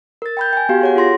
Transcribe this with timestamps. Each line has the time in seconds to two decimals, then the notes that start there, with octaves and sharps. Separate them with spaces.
0.22 A#4 A6
0.37 G5 B5 G6
0.53 G5 G#5
0.69 B3 F#4 G4 F5
0.81 G#4 C#5 F#5
0.96 F4 G#4 C6 A#6